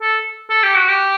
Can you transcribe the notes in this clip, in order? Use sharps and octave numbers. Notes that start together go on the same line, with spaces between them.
A4
A4
G4
F#4
G4